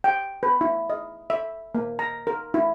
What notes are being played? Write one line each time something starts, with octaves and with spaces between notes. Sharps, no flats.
G5
B4
E4
D#5
E5
A#3
A#5
A#4
E4